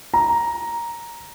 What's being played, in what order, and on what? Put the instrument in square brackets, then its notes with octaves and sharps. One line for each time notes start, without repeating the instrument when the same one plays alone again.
[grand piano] A#5